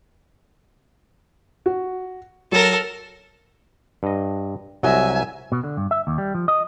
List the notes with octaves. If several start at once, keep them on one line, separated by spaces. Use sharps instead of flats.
F#4
F#3 A4 A#4
G2 D#5
C2 F#3 D#5 E5 G#5
B2
D3
G2
E5
D#2
G3
F3
D#5